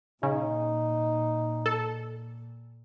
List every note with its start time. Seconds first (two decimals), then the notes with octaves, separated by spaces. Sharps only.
0.23 A#2 C#3 D#4
1.66 A4